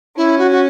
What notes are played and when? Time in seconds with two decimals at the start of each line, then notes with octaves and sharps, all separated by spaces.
0.17 C#4 E4
0.38 F#4
0.51 F#4